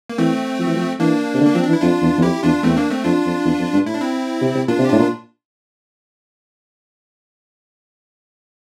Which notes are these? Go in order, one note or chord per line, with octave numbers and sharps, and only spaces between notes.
A#3
E3 A3 C4
F3
E3
F3
E3 A#3 D4
C3
D3
A#3
F3 C4
D4
E3
E4
F2 D4 F4
E2
E2
F2 E4 G4
E2 D4 F4
E2 A3 C4
A#3 D4
A3 C4
F2 D4 F4
F2
E2
F2
G2
A2 E4
D4
C4 E4
C3
C3
A#2 D4 F4
C3
G4
A2 D4 F4
A#2